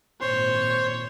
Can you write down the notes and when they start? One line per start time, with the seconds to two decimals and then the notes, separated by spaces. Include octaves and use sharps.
0.21 G#1 A#2 C5 C#5 C6